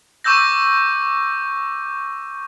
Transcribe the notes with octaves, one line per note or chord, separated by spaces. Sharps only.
C#6 D6 E6 G6 A#6